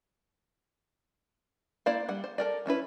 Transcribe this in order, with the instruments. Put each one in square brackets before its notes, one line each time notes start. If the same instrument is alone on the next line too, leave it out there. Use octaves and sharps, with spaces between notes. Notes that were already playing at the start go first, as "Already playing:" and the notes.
[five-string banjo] A#3 E4 C5 D5 F5
G3 F#5
C5
A4 A#4 D5
F3 C#4 E4 B4